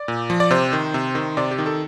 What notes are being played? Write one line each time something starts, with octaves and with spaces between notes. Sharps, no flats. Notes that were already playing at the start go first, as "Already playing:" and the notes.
Already playing: D5
A#2
F3
D5
C3 C5
D#3
C3
D#3
C3 D5
G4
D#3
A4